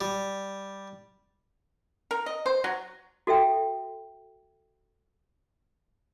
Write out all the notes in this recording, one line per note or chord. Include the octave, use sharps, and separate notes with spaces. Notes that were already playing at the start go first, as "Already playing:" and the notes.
G3
A#4
D#5
C5
F#3
F#4 A4 E5 G5